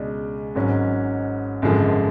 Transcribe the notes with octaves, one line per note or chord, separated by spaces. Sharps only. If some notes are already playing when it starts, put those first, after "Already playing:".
Already playing: C#2 B2 G#3 D4
G#1 G#2 F#3 C#4
G#1 F#2 D3 F3 G#3